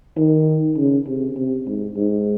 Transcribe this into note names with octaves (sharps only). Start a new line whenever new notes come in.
D#3
C#3
C3
C3
G#2
G#2